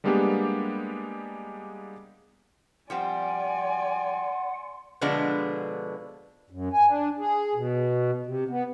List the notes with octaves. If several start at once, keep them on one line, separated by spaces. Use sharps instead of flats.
G3 G#3 A#3 B3 D4 G4
F3 G3 C4 D5 F#5 G#5 C6
B2 D3 F3 G#3 B3 D4
F#2
G#5
D4
G#4
B2
C3
B3